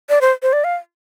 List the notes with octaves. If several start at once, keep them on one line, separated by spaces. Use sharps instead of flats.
D5
C5
C5
D5
F5